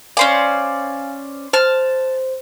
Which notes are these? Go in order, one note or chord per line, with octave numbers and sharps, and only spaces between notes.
C#4 C5 D5 F5 G#5 D6
C5 A5 F6